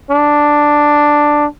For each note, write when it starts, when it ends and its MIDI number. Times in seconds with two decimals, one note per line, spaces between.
0.10 1.46 62